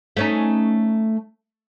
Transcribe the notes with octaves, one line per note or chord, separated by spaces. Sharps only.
A3 C#4 D#4